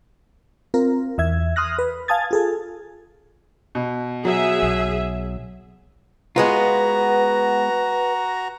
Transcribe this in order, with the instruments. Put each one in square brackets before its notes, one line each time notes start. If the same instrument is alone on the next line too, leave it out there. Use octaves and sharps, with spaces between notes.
[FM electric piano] C4 F4 A#4
E2 E5 G#6
C6 D#6 F6 F#6 A#6
B4
F5 G#5 A5 D#6 G#6 A6
F4 G#4 A4
[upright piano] B2
[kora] F#3 [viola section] G#4 E5
[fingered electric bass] B1
[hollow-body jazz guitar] G#3 B3 F4 [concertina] F#4 A#5 [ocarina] B4